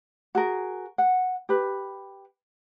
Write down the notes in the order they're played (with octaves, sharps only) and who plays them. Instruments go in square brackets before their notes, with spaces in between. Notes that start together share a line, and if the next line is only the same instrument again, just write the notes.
[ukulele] F#4 G#4 A#4
F#5
G4 B4